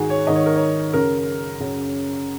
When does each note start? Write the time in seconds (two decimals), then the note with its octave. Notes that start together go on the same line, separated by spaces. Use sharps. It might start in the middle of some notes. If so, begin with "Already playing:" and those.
Already playing: G#2 D#3 F#4 G#4
0.10 C#5
0.26 G#2 D#3 D#5
0.36 C#5
0.46 A#4
0.56 C#5
0.93 F#2 C#3 A#4
1.60 F#2 C#3